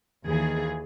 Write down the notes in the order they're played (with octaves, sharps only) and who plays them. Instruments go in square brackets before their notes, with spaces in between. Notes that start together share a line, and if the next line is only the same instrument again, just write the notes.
[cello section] D#2 E3 G#4